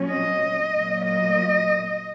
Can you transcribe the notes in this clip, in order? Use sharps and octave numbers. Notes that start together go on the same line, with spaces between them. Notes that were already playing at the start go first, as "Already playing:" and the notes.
Already playing: A#2 F#3 C#4
D#5
A#2 F#3 A#3
D#5